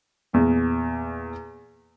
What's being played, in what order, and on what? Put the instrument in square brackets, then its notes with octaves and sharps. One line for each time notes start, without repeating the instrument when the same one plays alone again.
[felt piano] E2 A#2